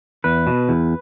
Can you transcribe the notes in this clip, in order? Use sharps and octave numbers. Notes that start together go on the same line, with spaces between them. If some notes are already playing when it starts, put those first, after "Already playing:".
E2 B4
B2
E2